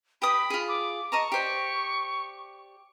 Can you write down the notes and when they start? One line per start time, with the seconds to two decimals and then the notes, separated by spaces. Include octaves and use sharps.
0.22 G4 B4 B5 D#6
0.50 F4 G#4
0.68 D6
1.12 D#5 A5 A#5 C#6
1.32 G4 C5 D5